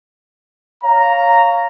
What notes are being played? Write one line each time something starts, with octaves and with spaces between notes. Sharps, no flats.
C#5 F5 A#5